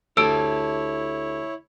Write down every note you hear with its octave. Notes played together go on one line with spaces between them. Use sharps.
D2 E4 G4 C#5 A5 E6 D7